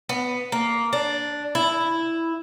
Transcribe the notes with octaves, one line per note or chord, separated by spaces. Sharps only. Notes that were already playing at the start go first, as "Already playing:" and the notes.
B3
A#3
D4
E4